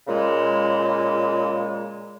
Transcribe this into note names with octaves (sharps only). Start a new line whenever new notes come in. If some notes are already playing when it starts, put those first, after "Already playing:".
A#2 C#3 G#3